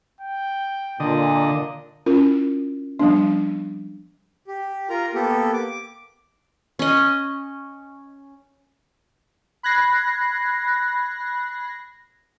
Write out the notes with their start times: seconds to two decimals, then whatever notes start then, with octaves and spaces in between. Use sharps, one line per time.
0.21 G5
1.00 A#2 D3 D#5
2.06 C#4 E4 F4 A#4
2.99 F3 G3 B3 D4
4.48 G4
4.89 F4 A#4 A#5
5.15 A#3 B3 G4 A4
5.53 D6
6.79 C#4 D#5
9.63 B5 F#6 G#6 A#6 C7